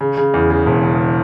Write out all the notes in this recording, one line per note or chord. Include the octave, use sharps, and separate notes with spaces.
C#3
C#3
E2
C#3
E1
C#3